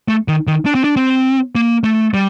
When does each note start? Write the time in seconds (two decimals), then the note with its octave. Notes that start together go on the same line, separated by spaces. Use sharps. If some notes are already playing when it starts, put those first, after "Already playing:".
0.08 A3
0.28 D#3
0.47 D#3
0.66 D4
0.75 C4
0.84 D4
0.96 C4
1.55 A#3
1.84 A3
2.14 G3